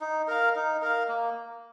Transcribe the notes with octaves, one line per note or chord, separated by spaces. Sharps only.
D#4
A#4 F5
D#4
A#4 F5
A#3